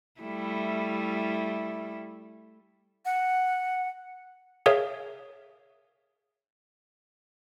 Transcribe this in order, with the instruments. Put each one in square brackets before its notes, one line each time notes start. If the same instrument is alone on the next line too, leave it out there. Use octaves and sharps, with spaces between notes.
[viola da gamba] G3 A3 E4
[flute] F#5
[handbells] G#4 A#4 C#5 E5 F5